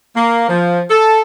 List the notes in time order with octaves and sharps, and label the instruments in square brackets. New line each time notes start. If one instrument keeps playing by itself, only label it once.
[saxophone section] A#3
F3
A4